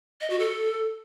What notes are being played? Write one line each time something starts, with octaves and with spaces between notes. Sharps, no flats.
D#5
F#4
A4